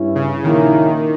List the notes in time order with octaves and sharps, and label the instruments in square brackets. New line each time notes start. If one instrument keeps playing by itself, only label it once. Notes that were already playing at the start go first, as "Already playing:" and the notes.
Already playing: [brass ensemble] G2 G3 C#4 E4
[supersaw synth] C#3
[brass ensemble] A#1 A#2 A#3 C#4 E4 [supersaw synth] D#3